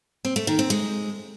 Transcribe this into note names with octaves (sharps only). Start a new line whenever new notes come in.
C4
A3
D#3
C4
G#3